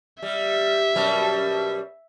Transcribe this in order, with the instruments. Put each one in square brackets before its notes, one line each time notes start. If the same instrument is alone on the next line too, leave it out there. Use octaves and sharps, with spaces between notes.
[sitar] G3 [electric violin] E5
[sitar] F#2 B2 G3